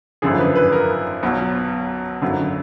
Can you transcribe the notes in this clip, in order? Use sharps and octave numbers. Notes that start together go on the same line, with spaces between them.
G#1 F#2 D3 F3 G#4
B4
B4
A#4
B1 B2 F#3
G#1 F#2 D3 F#3